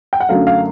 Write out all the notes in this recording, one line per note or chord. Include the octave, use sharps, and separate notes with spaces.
G5
F#5
F#2 D3 F#3 A3 F5
F5